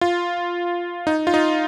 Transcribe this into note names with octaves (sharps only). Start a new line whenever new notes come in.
F4
D#4
F4
D#4